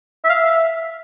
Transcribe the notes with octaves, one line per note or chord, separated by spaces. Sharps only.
E5
F5
E5